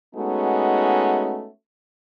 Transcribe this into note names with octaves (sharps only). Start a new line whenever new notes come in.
G#3 A3 B3 C#4 D#4 F#4